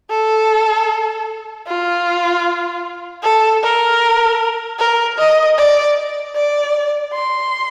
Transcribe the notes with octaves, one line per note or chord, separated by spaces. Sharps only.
A4
F4
A4
A#4
A#4
D#5
D5
D5
C6